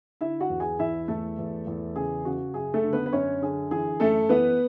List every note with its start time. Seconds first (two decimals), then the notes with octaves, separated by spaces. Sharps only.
0.21 D3 E4 E5
0.40 F#4 F#5
0.50 E2
0.60 G#4 G#5
0.79 E2 E4 E5
1.08 E2 A3 A4
1.38 E2
1.67 E2
1.96 C#3 G#4
2.25 C#3 F#4
2.54 F#2 G#4
2.74 A3 A4
2.84 D3
2.93 B3 B4
3.06 B4
3.12 F#2 C#4 C#5
3.42 D3 G#4
3.71 E3 G#4
4.00 F#2 A3 A4
4.29 E3 B3 B4